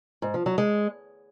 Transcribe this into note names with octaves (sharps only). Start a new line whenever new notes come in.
G#2
F3
F#3
G#3